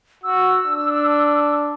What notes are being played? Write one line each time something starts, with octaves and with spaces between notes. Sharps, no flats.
F#4 E6
D4